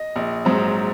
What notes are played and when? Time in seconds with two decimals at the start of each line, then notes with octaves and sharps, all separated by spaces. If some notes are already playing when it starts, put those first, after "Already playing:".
Already playing: D#5
0.16 A#1
0.45 G#2 F#3 C4